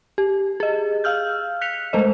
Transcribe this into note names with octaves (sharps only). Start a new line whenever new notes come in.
G4
G#4 D#5
F5 E6 F6 G6
F#6 B6 C#7 F7
G#3 A3 C5 D#5